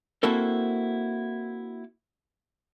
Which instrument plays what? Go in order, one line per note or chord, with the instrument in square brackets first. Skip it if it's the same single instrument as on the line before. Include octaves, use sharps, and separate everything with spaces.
[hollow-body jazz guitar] A#3 C4 E4 F#4 A4 A#4